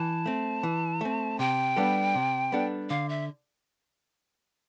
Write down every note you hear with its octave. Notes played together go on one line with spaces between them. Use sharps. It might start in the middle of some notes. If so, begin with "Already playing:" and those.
Already playing: E3 A5
A3 C4
E3
A3 C4
C3 G5
G3 B3 D4 A4
C3
G3 B3 D4 A4
D3 F5
E5